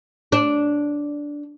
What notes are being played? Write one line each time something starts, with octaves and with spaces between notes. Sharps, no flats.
D4